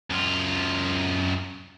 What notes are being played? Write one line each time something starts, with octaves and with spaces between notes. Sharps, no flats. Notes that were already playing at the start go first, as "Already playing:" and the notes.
F#2 F4